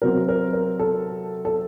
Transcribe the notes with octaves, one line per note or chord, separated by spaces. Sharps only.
C3 F#3 C4 A#4
A#4
A#4
A4
A4